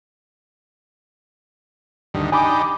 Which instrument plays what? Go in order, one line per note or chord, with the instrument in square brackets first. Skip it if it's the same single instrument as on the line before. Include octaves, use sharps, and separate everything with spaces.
[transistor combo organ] D2 G2 D#3
[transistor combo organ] D4 D#4 G4 [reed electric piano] G#5 B5 D6